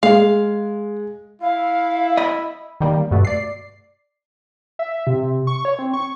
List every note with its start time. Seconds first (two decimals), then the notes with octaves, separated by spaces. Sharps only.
0.03 G#3 F5
1.41 E4 F5
2.17 D#5 B5
2.80 D#3 G3 A#3
3.11 G2 B2 A3
3.25 D5 C7
4.79 E5
5.07 C3
5.47 C#6
5.65 C#5
5.79 C4
5.93 C#6